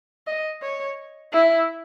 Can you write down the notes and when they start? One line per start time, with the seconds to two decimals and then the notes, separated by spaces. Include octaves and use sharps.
0.27 D#5
0.62 C#5
1.33 E4